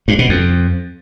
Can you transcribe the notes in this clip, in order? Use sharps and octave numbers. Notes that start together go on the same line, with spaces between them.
G2
B2
F2